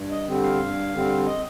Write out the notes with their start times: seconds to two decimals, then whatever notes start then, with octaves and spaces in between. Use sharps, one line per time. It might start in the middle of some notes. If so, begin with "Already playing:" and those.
Already playing: G2
0.10 D#5
0.26 D3 G3 C4
0.43 F5
0.60 G2
0.93 D3 G3 C4
1.26 D#5